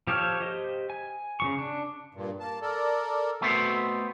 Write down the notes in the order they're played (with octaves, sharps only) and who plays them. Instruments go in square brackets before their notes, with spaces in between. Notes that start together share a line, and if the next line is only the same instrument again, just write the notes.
[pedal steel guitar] F3 G4 A4 C#5 F6
G4 C5 D#5
G#5
C#3 F3 C#6
D4
[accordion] G2 A#2
A#3 A5
A4 A#4 D5
[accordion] B2 [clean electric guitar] A3 B3 C4